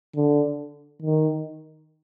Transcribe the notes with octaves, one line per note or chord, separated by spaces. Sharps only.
D3
D#3